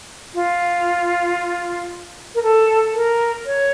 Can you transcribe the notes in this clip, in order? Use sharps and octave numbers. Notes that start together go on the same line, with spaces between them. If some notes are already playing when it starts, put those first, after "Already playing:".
F4
A#4
A4
A#4
C#5